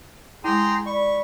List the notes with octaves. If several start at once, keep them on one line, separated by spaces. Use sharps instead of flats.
G#3 E4 G#4 G5 A#5 C6
D5 B5 C#6